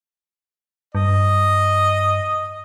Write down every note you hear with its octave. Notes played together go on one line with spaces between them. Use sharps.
G2 D#5